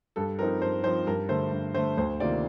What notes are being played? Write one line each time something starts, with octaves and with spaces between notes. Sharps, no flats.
G2 A4
F3 C4 D#4 A#4
G2 C5
F3 C4 D#4 C5
G2 A#4
D3 A3 C5
G2
D3 A3 C5
D2 C5
C3 D#3 A#3 F4 D5